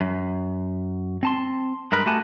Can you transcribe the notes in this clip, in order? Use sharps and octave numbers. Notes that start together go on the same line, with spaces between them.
F#2
C4 A5 C6
G2 G#3 A#4 B4
A3 F#4 G4 F#5 G#5 A5